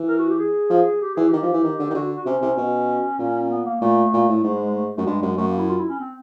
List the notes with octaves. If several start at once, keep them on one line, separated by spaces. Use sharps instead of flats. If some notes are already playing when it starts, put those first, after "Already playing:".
Already playing: E3
A#4
F#4
G4
G#4
F3
G4
E3 G#4
G4
D#3
F3
E3
D#3
D3
D#3
D3 F#4
F#4
C3 C#4
C3
B2
A#2
B3
A#3
A#2 A3
A#2
A2
G#2 A3
G#3
G#3
A3
F#2 A3
G2 G#3
F#2 G#3
F#2 A3
A#3
E4
F4
E4
C#4
C4